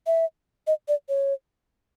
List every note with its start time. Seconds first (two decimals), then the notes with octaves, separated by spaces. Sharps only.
0.07 E5
0.67 D#5
0.88 D5
1.09 C#5